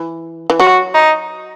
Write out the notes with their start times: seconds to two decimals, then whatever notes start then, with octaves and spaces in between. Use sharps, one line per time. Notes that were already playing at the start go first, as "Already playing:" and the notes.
Already playing: E3
0.50 E3
0.59 F#3 F#4
0.95 D#4